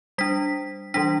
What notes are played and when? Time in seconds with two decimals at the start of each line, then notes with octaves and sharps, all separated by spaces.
0.18 G3 D4 B6
0.94 E3 G3 D4 B6